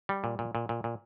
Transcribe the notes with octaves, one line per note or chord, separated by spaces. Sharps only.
G3
A#2
A#2
A#2
A#2
A#2